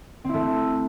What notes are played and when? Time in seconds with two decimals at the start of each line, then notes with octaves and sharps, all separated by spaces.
0.24 C4
0.29 E4
0.34 A3